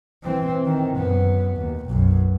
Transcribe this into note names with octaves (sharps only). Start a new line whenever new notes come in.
E3 C4
D#3
F#2 B3
D#2
B1 F#2